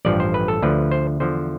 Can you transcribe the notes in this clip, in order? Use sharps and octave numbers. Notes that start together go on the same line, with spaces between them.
A1 G2 F3 D5
C5
B4
A4
D2 D3 F3 B4
C5
E2 D3 F3 C5